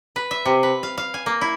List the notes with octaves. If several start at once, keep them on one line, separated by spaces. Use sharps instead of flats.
B4
E5
C3
B4
F5
F5
G#5
A#3
E4